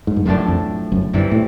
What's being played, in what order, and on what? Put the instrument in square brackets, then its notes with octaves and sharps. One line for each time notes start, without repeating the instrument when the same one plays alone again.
[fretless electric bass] G#2
G2
[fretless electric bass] F#1 F#2 [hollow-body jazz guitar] B1 A2 F3 A3 D4
[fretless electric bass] F2
F#1 F#2
[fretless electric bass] G1 G2 [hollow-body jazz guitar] C3 E3 G3 C4
[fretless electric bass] A2